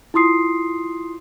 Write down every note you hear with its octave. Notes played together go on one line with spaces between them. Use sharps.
E4 F4 C6 D#6 C7